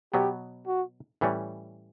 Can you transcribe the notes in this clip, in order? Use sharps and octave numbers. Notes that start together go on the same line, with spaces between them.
B2 F#3 B3 G4
F#4
A2 E3 G3 C#4